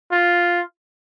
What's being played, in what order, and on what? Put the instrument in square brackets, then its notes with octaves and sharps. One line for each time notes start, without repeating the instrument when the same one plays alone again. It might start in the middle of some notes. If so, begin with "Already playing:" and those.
[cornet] F4